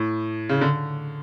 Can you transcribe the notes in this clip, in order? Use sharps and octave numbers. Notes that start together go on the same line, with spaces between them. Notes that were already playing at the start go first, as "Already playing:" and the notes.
Already playing: A2
C#3
D3